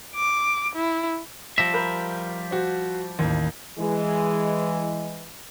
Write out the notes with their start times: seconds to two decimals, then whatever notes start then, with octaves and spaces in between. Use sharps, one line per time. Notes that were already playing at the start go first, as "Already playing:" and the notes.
0.15 D6
0.76 E4
1.58 F3 G3 E5 A#6
1.74 A#4 B5 G6
2.51 F#4 C5
3.19 A1 D#2
3.79 E3 G#3